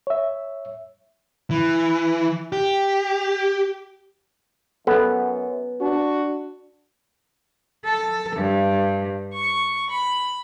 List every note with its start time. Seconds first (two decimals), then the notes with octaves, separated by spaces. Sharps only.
0.07 C#5 E5
1.51 E3
2.52 G4
4.87 F#2 B3 A4
5.81 D4 F#4
7.83 A4
8.37 G2
9.34 C#6
9.90 B5